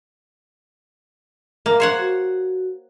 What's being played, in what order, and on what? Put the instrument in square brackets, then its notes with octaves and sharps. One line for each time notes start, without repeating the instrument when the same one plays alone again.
[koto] A#3
C5 C#5 F#5
[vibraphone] F#4